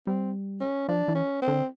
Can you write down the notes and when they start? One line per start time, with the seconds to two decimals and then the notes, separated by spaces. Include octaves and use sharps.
0.07 G3 C4
0.61 C#4
0.88 F3 D4
1.08 E3
1.15 C#4
1.42 C4
1.48 D3